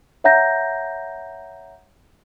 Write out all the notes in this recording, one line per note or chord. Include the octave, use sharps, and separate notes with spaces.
C#5 E5 F#5 A#5 G6 A#6